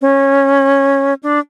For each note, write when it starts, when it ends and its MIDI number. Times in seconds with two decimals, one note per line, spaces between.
0.02 1.14 61
1.23 1.39 62